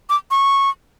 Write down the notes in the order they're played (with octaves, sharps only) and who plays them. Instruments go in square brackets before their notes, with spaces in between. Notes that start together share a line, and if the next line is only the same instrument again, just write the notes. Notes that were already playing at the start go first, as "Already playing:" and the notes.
[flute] D6
C#6